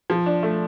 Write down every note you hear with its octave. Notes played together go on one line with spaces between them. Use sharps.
F3
D4
A3